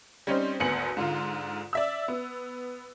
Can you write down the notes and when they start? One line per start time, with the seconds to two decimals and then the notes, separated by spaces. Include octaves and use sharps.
0.27 G3 C4 C#4 D#4 C5
0.60 G#1 D2 B3 G#5 C#7 F#7
0.97 G#2 D3 F4
1.73 D5 E5 E6
2.08 B3